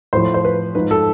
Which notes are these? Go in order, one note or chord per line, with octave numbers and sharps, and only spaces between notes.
A2 F3 C5
C5
B4
G#2 F3 B4
A4